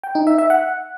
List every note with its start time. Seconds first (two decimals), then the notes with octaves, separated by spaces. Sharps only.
0.03 G5
0.15 D#4
0.27 E5
0.38 E5
0.50 F#5